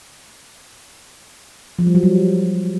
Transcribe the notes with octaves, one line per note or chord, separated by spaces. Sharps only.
F3
G3
F#3
G3